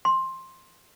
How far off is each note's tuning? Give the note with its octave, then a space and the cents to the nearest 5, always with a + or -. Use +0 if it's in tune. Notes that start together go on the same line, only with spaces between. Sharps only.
C6 +15